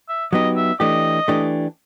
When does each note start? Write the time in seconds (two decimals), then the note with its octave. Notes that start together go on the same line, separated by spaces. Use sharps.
0.09 E5
0.32 F#3 B3 D#4 G4 D#5
0.57 E5
0.80 E3 A3 D4 G4 D#5
1.28 E3 A3 D4 G4